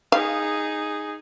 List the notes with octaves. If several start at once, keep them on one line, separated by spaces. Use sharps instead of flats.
D#4 G#4 F5